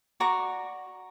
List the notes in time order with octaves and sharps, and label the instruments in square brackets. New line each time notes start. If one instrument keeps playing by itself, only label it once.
[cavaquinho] F#4 D5 A#5 C#6